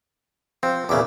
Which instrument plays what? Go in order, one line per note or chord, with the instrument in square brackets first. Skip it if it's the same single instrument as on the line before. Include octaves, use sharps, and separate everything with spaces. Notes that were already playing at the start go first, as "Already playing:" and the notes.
[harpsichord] F3 [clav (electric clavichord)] C4
[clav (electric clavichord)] E2 C#3 [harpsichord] A#2 E4 D6